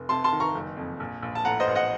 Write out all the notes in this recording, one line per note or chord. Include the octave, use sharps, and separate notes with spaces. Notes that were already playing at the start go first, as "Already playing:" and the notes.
Already playing: F1
C3 A5 C6
A5 C6
D#3
A#5 C#6
F#1
F2
A#1
A#1
A5
A2 F#5 A#5
C5 D#5
A1
D#5 F#5